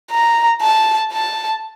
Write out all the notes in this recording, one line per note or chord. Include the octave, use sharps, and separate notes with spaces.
A#5
A5
A5